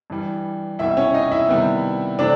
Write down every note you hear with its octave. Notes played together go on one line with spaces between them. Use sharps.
G2 E3 G3
C2 B2 G3 E4 E5
C#4 C#5
D#4 D#5
E4 E5
C3 D#3 G3 B3
C3 E3 A3 C4 D4 D5